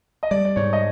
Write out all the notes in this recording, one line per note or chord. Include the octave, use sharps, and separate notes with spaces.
D#5
G3 D5
D5
G#2 C#5
D#5